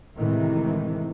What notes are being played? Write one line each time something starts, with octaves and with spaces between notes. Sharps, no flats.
A2 C3 D#3 E3 G#3